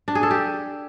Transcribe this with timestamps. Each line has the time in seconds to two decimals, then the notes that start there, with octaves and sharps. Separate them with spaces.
0.08 D4
0.15 G#4
0.23 A4
0.31 G4